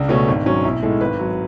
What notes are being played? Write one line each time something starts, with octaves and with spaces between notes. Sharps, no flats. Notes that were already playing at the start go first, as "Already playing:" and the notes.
Already playing: C#2 D4
B2 A3 C#4
G#1
G#2 F#3 C#4
B1 E4
A2 G#3 A4
G#1 B4
F#3